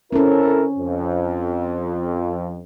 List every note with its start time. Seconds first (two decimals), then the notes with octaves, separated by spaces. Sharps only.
0.12 C4 C#4 E4 A4 A#4
0.78 F2